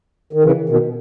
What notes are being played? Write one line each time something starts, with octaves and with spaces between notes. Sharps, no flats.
D#3
C#3 E3
B2 D#3